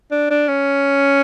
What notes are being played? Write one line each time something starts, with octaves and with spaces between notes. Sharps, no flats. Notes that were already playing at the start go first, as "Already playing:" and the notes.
D4
D4
C#4